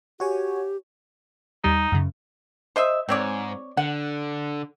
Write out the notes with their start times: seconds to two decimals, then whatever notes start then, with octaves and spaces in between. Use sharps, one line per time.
0.20 F#4 G4 C#5 G#5
1.64 D#2 G3 D#4
1.92 F#2 C#3
2.76 C5 D#5 E5
3.09 G#2 C4 C#5 D5
3.77 D3 F#5